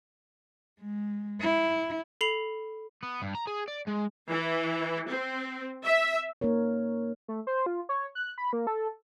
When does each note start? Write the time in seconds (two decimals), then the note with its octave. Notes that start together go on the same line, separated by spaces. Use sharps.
0.81 G#3
1.41 E4
2.21 A4 B5 C7 F7
3.03 B3
3.22 G2
3.35 A#5
3.47 G#4
3.68 D5
3.88 G#3
4.29 E3
5.08 C4
5.84 E5
6.41 A#3 D#4 A#4 C#5
7.28 A3
7.47 C5
7.66 F4
7.89 C#5
8.15 F#6
8.38 B5
8.53 A#3
8.67 A4